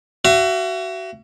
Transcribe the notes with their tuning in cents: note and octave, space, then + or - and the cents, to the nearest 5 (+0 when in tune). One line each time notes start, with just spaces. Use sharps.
F#4 +25 E5 +40